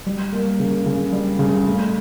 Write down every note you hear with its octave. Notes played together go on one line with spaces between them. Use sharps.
G3
A#3
C#3
C#3
G3
C#3
A3